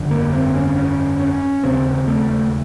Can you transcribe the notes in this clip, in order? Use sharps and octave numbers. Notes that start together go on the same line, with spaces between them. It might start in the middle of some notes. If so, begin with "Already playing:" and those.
Already playing: G1 F2 D3
A#3
C4
C#4
C#4
C#4
E1 D#2 C#3 C4
A3